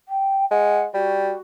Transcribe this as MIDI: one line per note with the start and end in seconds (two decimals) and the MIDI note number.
0.09 0.45 79
0.51 0.87 56
0.51 0.84 78
0.94 1.34 55
0.94 1.42 66